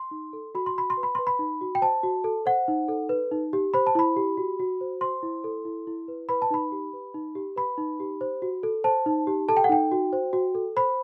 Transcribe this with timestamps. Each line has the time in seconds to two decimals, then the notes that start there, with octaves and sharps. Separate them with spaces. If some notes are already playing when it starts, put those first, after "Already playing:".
Already playing: C6
0.11 D#4
0.33 A4
0.55 F#4 B5
0.66 C6
0.76 F#4 B5
0.90 C6
0.97 B4
1.03 B5
1.15 B4 C6
1.27 B5
1.39 D#4
1.61 F#4
1.75 G5
1.82 C5 A5
2.03 F#4
2.24 A4
2.46 C5 F#5
2.68 D#4
2.88 A4
3.09 B4
3.32 D#4
3.53 G4
3.74 C5 B5
3.87 A5
3.95 E4 B5
4.16 G4
4.37 F#4
4.60 F#4
4.81 C5
5.01 C5 C6
5.23 E4
5.44 A4
5.65 E4
5.87 E4
6.08 B4
6.29 B4 B5
6.42 A5
6.51 D#4 B5
6.72 G4
6.93 B4
7.14 D#4
7.35 G4
7.56 B4 B5
7.78 D#4
8.00 G4
8.21 C5
8.42 F#4
8.63 A4
8.84 C5 A5
9.06 D#4
9.27 G4
9.49 A4 A5
9.57 G5
9.64 F#5
9.69 D#4 G5
9.92 F#4
10.13 C5
10.33 F#4
10.55 A4
10.76 C5 B5